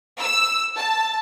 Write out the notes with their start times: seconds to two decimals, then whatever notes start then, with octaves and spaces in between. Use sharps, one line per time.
0.20 E6
0.76 A5